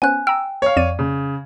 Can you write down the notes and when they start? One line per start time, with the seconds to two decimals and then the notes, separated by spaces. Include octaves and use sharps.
0.02 B3 C#4 C5 G#5 F#6
0.27 G5 A#5 E6
0.62 C#5 F5
0.77 F2 D5 D#7
0.99 C#3